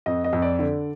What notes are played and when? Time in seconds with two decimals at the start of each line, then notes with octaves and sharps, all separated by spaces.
0.06 F2 D#5
0.24 D#5
0.33 F2
0.42 D5
0.59 D3 D5